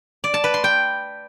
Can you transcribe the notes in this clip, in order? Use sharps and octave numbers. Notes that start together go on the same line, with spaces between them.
D5
A5
B4
C6
G5